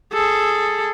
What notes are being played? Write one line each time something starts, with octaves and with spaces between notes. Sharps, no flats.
G#4 A4